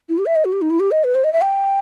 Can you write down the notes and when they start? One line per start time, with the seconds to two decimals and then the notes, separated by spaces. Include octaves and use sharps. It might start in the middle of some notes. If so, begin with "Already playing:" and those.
0.09 E4
0.18 G4
0.26 E5
0.36 D#5
0.45 F#4
0.52 G4
0.61 D#4
0.70 E4
0.80 G4
0.91 D#5
1.04 B4
1.15 C5
1.24 D#5
1.33 E5
1.42 G5